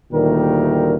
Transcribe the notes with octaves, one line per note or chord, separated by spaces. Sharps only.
D2 A#2 D#3 G3 A#4